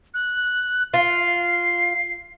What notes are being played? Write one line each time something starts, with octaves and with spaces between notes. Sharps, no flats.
F#6
F4 C7